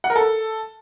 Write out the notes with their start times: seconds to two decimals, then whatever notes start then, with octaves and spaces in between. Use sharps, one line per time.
0.04 F#5
0.10 A#4
0.16 A4